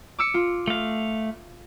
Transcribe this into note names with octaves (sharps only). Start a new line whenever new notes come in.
D6 E6 C#7
F4
A3 F5